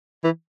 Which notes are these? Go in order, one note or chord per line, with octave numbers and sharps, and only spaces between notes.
E3